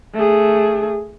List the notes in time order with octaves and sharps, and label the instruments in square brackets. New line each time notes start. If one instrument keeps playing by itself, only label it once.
[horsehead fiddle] A3 G#4